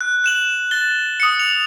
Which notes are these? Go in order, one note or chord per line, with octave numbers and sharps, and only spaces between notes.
F#6
F#6 E7 F#7
A6 G7
D#6 C#7
F7